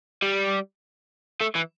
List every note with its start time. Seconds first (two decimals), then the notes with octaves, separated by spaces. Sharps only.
0.22 G3
1.41 A3
1.56 E3